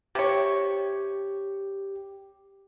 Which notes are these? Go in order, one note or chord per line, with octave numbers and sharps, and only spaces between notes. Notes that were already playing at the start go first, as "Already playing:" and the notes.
C3 G4 C#5